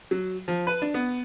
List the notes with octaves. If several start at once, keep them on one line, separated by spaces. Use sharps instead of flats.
F#3
F3
B4
D4
B3